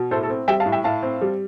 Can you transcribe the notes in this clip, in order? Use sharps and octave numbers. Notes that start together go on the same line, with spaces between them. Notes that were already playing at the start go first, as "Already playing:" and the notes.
Already playing: B2
A2 A4 C5
A4
C4
G3 E5 G5
F5 A5
A2
E5 G5
A2 F5 A5
C4
G3